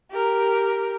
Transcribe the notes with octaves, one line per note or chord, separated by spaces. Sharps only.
G4 A#4